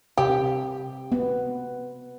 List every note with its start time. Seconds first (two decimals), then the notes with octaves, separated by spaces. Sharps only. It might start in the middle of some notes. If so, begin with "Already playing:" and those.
0.18 C3 G4
1.12 B3